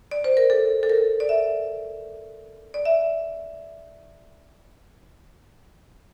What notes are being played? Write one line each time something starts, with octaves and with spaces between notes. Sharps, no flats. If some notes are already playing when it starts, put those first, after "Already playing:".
D5
C5
A#4
A4
A4
A#4
D5
E5
D5
E5